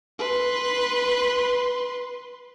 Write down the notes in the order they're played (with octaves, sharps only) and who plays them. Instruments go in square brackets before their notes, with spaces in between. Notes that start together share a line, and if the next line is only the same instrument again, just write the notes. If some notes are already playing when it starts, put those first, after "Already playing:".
[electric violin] B4 C6